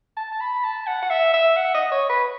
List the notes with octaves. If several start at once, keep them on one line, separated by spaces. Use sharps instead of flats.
A5
A5
B5
A5
F#5
F#5
E5
E5
F#5
D#5
C#5
B4